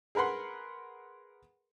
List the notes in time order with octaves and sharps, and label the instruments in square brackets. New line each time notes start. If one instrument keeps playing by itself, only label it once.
[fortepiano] G#4 A#4 B4 F#5 C6